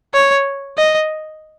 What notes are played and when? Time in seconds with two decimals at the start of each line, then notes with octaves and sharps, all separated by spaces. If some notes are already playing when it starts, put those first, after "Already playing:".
0.14 C#5
0.78 D#5